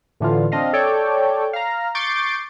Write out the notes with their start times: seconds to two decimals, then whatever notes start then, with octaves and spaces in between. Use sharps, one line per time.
0.20 A2 D3 E3 F4
0.52 C4 D4 D#5 F5
0.73 A4 C#5 D5 G5
1.53 F5 A#5
1.95 C#6 D6 G6 A6 C7 D7